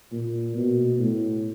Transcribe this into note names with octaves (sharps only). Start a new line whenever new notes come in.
A#2
B2
A2